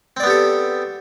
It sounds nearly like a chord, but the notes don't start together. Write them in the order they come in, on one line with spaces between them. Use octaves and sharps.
C4 D5 B3 G4 A4